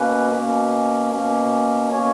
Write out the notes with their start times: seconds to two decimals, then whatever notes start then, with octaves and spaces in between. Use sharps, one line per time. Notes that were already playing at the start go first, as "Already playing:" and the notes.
Already playing: B2 A#3 C#4 B4
0.34 B2 A#3 C#4
1.12 B2 A#3 C#4
1.91 B2 A#3 C#4 C#5